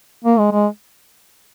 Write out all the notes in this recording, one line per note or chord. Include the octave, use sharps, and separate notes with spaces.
A#3
G#3
G#3